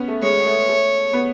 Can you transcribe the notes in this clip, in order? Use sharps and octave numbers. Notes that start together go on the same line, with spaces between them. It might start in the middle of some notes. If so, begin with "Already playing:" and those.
Already playing: B3 C#4
A3
G#3 C#5
A3
A3
B3